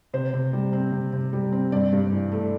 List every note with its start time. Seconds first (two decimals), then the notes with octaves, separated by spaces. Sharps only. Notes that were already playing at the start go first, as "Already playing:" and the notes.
0.14 C3 C5
0.34 C3
0.53 G3
0.73 C4
0.92 C3
1.13 C3
1.33 G3
1.52 C4
1.72 G2 D5
1.93 G2
2.12 E3
2.32 A3